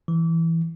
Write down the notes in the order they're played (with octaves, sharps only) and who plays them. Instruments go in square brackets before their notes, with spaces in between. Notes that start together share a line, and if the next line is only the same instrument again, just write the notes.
[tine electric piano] E3